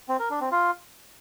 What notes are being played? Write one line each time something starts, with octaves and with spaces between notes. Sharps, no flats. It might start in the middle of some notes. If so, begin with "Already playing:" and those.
C4
A#4
D4
C4
F4